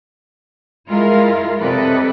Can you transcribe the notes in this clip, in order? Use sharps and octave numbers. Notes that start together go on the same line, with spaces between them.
G#3 E4 F4 A#4
C3 G3 A4 B4 D5 D#5